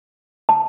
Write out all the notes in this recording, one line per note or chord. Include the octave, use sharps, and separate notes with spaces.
A5